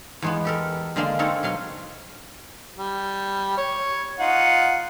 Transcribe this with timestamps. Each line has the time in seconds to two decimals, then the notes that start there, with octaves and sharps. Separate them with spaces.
0.22 E2 G#3 B3
0.45 G4 A4 A#4
0.96 D3 G#3 A#3 D5 F5 C6
1.19 C4 D#4 A4 A#4 C#5
1.43 B2 F#3 F5 C6
2.78 G3
3.57 C#5
4.19 D#4 F4 F#5